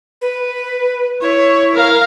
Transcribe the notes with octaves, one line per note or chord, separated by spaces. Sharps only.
B4
E4 C#5
A#4 F5